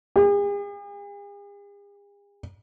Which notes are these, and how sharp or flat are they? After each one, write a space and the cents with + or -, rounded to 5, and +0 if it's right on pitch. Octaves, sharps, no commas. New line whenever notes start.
G#4 -45